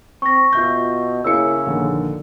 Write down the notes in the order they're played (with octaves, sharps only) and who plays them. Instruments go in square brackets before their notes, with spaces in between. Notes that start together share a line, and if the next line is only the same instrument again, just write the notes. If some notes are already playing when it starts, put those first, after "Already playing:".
[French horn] C4 [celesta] C#6 A#6
[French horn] B2 [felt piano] F4 E5 G6
[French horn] C#3 [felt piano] A#3 E4 C#7 [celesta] E6
[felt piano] A#1 D3 D#3